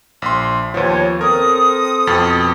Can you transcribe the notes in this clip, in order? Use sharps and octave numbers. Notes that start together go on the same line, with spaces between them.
A#1 C6
D#2 F3 B3 C#5
C4 A4 A#4 D#6
F2 B2 A6